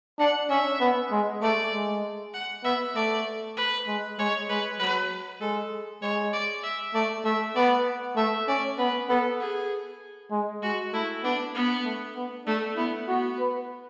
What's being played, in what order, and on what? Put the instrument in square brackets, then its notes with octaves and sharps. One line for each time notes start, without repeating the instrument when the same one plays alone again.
[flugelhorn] D4 [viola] F#5
[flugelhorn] C#4 [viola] E5
[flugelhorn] B3
G#3
[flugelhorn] A3 [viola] D5
[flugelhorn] G#3
[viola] F#5
[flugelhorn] B3 [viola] E5
[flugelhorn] A3 [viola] D5
[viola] B4
[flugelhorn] G#3
[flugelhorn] G#3 [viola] C#5
[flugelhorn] G#3 [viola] B4
[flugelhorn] F#3 [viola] B4
[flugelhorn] G#3 [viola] A4
[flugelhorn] G#3 [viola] C#5
[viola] D5
E5
[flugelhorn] A3 [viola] D5
[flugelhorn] A3 [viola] E5
[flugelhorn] B3 [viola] D5
[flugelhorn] A3 [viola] E5
[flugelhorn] C#4 [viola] D5
[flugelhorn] B3 [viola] B4
[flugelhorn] B3 [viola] A4
[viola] G#4
[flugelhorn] G#3
[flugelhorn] G#3 [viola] F#4
[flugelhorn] A3 [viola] E4
[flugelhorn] B3 [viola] D4
[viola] B3
[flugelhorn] A3
B3
[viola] A3 [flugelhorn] D4
[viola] B3 [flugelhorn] E4
[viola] B3 [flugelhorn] F#4
[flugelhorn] B4